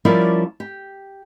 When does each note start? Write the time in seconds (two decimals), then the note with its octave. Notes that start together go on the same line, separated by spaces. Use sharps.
0.05 F3 G3 C#4 E4 A#4 D5
0.60 G4